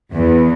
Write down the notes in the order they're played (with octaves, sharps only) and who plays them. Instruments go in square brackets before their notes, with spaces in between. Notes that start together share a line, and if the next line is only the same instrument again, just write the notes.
[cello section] E2